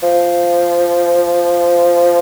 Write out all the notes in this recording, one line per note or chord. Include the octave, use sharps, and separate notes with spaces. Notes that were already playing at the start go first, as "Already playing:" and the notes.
F3